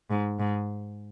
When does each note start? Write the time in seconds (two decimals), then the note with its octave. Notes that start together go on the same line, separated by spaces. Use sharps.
0.10 G#2
0.40 G#2